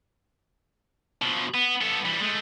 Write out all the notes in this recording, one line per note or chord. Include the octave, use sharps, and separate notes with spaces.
B2 F3
B3
B3 A4
E3 G3
G#3 A3